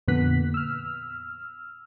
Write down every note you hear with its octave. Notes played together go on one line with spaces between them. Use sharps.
F2 A#2 D3 B3 F#6 B6
E6 F6